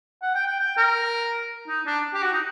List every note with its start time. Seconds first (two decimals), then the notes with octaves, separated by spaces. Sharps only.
0.22 F#5
0.35 G5
0.46 G5
0.59 G5
0.77 A#4
1.68 D#4
1.86 D4
2.14 G4
2.22 F#4
2.33 D#4